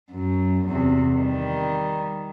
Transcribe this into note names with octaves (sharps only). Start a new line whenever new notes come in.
F#2
E2 C3
D#3 G3